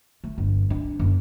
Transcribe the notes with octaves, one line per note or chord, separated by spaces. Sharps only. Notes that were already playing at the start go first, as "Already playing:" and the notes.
A3
G1
D4
F#1